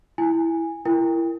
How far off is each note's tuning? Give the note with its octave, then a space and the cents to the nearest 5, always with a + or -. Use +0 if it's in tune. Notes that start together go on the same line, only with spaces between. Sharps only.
E4 +0 G#5 -10
E4 +25 A#4 +0 G5 +25